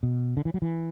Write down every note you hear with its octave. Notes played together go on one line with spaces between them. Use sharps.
B2
D3
E3
F#3
E3